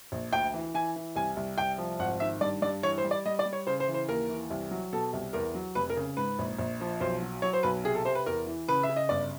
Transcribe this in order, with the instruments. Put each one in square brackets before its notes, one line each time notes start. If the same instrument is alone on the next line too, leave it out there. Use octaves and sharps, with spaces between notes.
[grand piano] A#1
D2 G5
E3
E3 G#5
E3
C2 G#5
C2
C2 G5
F3
G#1 F#5
D#3 E5
G2 D5
G2 D5
E3 C#5
C5
G3
D5
G3 D#5
D5
G3
C#5
C#3 C5
C5
E3
C5
D#2 A#4
E3
C2
F#3
B2 A4
C2
E2 A#4
F#3
F1 B4
A#4
C#3
G#2 B4
A#1
A#1
F3
B1 C5
F#3
F#3 C#5
C5
B1 B4
C3 G#4
A4
C3 C5
B4
E2 A#4
E3
C#3 B4
E5
C#3
D#5
G1 D5